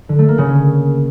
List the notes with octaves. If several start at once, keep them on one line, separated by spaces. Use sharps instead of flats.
D3
A3
A#3
C#3
C#4